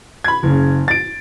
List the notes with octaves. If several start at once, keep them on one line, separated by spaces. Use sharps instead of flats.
B5 G#6
F#1 C#3
A6 D7